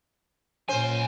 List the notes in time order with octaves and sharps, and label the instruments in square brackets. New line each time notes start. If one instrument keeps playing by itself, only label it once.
[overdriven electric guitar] B1 G#5 [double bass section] A#2 [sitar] C#4 C5